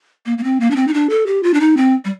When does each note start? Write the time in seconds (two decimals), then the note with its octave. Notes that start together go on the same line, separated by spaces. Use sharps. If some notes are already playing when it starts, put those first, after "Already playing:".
0.26 A#3
0.38 A#3
0.44 C4
0.60 A#3
0.71 D4
0.76 C4
0.87 D#4
0.94 D4
1.10 A4
1.26 G4
1.43 F4
1.54 D4
1.60 D#4
1.77 C4
2.05 G3